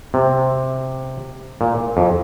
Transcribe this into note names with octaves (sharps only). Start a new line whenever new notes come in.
C3
A#2
F2